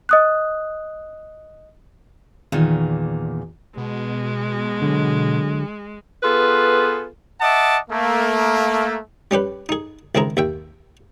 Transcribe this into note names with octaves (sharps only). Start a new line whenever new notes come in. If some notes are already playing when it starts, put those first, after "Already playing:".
D#5 D#6 F#6
E2 A#2 D#3
B2 G#3
D3 F#3
B3 F4 G#4 A4 B4
D#5 E5 F#5 A5 D6
A3 A#3
G3 C#4 G4 B4
D#4 G#4
C#2 D#3 C4 E4 G#4 A#5
D#2 E5 G5